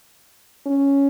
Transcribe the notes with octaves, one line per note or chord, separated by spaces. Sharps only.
C#4